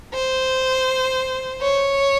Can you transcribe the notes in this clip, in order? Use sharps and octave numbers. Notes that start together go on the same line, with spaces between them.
C5
C#5